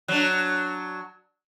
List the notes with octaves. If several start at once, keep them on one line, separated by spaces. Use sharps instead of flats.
F#3 D4